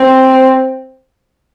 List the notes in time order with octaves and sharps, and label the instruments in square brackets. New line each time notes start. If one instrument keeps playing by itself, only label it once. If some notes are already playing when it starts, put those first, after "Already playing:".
Already playing: [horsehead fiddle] C4